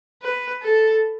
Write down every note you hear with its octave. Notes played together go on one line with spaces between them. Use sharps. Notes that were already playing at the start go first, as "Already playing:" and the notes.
B4
A4